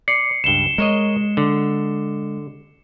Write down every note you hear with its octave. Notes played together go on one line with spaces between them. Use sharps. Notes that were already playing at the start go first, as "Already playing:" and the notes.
D5 C7 C#7
C#2 G2 E7 G7
G#3 A#4 C#5 D#5
D3